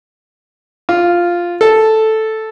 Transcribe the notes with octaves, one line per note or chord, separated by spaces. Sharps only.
F4
A4